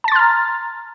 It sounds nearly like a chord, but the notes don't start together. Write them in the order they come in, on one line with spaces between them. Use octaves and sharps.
A5 A6 C6 F6 A#5